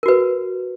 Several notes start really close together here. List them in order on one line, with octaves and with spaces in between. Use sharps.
A#4 F#4 B4